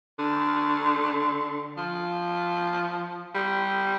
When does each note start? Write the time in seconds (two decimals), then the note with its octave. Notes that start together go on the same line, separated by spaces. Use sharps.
0.19 D3
1.77 F3
3.35 G3